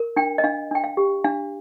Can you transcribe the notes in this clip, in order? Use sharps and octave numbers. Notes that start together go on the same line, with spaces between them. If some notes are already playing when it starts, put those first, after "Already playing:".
Already playing: A#4
D4 G5
D#5
D4 F5
D4 G5
F5
G4
D4 F5